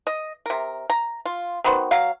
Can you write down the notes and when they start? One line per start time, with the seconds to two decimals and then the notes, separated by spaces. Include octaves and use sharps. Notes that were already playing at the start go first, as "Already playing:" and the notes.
0.07 D#5
0.46 C3 A#4
0.90 A#5
1.25 F4
1.64 D#3 B3 F#4 C5
1.91 F#3 F5